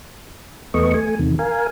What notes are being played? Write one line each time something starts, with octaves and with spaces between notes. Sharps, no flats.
E2 A3 B3 D#5 C#6
A3 G#5
E2 C3 D#3
A#4 F5 G#5